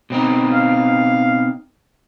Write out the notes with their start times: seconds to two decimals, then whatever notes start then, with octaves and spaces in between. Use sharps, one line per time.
0.10 B2 C4 D#4
0.52 F5